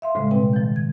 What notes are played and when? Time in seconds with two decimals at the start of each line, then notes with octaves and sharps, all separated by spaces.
0.02 E5 F5 C6
0.15 A2 C#3 G3 G#3
0.31 B2 C4 B4 G5
0.53 D#3 F3
0.76 G#6